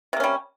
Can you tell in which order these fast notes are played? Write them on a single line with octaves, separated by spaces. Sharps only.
C3 A#3 C#4 G3